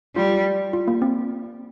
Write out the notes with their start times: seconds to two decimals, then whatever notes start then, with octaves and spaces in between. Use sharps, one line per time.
0.15 G3 F4
0.73 F4
0.88 A#3
1.02 C4